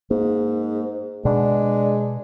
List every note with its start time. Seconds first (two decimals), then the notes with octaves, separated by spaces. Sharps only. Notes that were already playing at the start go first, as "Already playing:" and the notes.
0.11 G#2 A#3
1.25 B2 G#3 D4